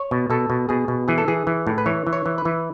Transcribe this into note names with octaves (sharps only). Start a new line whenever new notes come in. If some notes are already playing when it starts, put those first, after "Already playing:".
Already playing: C#5
B2
B2 A4
B2
B2 G#4
B2
E3 G#4
A4
E3 G#4
E3
A2
B4
E3 C#5
E3
C#5
E3
B4
E3